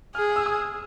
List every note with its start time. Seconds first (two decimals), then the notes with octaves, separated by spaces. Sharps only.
0.15 G#4 F6
0.36 E6
0.46 D#6